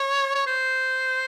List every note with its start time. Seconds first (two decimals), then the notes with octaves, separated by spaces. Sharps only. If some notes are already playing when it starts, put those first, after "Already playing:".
Already playing: C#5
0.35 C#5
0.47 C5